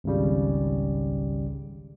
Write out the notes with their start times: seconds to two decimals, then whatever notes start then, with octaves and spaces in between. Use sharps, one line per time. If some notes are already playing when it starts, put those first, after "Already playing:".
0.04 G#1 C#2 C#3 G3